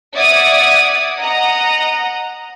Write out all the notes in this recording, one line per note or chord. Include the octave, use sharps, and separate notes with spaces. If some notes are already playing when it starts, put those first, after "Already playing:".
D5 E5 F#5 D6 D#6 G#6
D#5 F#5 A#5 D#6